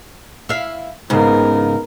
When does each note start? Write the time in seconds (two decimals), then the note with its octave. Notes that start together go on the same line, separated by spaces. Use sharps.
0.49 E4 F5
1.10 G#2 C#3 B3 A#4